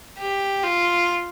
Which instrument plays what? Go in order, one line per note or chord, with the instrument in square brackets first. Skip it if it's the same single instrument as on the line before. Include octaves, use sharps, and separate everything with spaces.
[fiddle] G4
F4